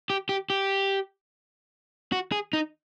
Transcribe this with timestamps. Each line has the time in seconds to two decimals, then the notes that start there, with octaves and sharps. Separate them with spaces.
0.10 G4
0.29 G4
0.50 G4
2.12 F#4
2.32 G#4
2.53 D#4